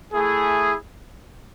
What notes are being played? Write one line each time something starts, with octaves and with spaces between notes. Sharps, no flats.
A3 E4 G#4